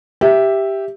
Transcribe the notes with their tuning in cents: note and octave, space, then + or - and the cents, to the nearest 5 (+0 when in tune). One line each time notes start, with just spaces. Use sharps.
G4 +0 E5 +0